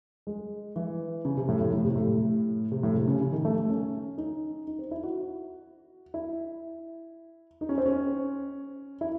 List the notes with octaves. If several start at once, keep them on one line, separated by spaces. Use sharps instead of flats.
G#3
E3
C#3
C3
A2
A2
A2
C3
A2
C3
A2
C3
C#3
C#3
D#3
A3
A3
C#4
D#4
D#4
C4
E4
F#4
E4
D#4
C#4
C4
C#4
E4